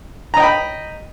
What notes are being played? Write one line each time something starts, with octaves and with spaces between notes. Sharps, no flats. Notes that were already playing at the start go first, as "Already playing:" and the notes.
D#5 G5 A#5 B5